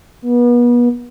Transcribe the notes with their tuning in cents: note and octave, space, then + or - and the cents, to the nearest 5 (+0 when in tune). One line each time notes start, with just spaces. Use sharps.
B3 -35